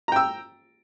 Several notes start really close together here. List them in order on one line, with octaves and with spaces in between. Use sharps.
A#5 G5 E6